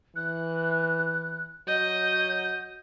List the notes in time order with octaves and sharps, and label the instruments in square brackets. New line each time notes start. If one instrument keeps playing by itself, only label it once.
[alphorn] E3 [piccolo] F#6
[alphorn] F#3 [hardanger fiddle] D#5 [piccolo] G6